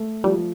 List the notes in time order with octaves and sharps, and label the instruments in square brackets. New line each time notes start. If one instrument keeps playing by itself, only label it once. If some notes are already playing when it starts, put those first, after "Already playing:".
Already playing: [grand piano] A3
[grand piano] F3 [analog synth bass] G3